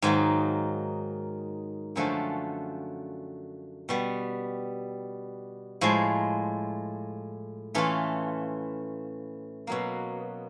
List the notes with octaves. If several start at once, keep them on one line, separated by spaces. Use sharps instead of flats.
G#2 D#3 F#3 A#3
F#2 D3 F3 A3 C#4
B2 G3 B3
A2 F3 G#3
E3 A3 C#4 F4
B2 F#3 A#3